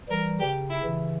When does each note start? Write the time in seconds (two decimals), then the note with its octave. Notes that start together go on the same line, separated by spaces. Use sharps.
0.09 E3 G3 A#4
0.40 C#3 G4
0.70 E4
0.84 C#3 E3